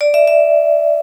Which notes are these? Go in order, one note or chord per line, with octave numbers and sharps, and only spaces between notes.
D5
E5
E5